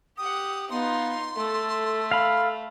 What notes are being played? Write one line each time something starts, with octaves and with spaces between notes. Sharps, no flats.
G4 F#5 D#6
B3 D#4 F4 C6
A3 A4
F5 B5